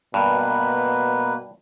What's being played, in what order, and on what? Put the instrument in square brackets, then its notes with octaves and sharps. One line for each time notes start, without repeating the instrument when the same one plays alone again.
[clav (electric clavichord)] G2 [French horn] B2 [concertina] A#3 B4